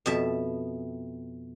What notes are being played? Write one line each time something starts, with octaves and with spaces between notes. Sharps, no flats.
F2 B2 E5 A5